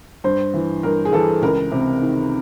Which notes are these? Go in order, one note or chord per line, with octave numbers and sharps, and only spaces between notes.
G2 C5
E3
G2 A#4
G#4
E3 A4
C#2 A#4
C3
D#3